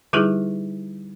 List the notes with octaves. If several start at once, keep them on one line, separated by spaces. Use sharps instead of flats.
D3 G3 D#4 E4 G4 G#4